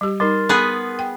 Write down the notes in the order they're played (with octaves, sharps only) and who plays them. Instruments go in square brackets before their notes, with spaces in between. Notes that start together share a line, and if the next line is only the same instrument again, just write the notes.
[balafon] G3 G4
[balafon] G3 D#4 [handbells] A#4 C6 A6
[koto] B3 G#4 B4
[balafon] G5